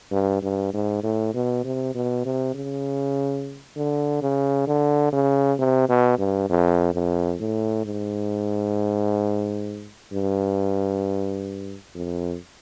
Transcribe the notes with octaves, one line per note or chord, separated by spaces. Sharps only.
G2
G2
G#2
A2
B2
C3
B2
C3
C#3
D3
C#3
D3
C#3
C3
B2
G2
F2
F2
A2
G#2
G2
F2